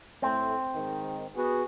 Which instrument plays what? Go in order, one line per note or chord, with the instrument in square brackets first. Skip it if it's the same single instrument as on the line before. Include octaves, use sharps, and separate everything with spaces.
[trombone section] A2 A3 [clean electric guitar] C4
[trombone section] G#2 D#3
B3 F#4 G#4